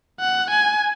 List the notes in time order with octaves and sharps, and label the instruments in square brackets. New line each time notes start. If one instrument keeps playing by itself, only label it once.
[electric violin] F#5
G#5